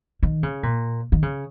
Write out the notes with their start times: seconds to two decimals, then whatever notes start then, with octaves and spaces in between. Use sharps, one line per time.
0.23 D#3
0.43 C#3
0.63 A#2
1.12 D#3
1.23 C#3